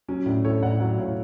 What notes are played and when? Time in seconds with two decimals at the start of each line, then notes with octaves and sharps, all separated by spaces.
0.09 F#3 C#4
0.26 A2 D4
0.45 A2 A4 C#5
0.62 A2 D5 F#5
0.80 F#3 D5 F#5
0.98 A2 C#5 F5